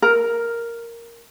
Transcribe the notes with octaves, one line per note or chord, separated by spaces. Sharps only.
A#4